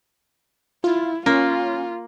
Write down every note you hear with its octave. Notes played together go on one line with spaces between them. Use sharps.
E4 F4
A#3 C#4 F4